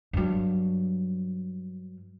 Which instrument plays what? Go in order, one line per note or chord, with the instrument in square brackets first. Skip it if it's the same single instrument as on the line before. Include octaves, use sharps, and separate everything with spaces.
[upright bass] G2 F#3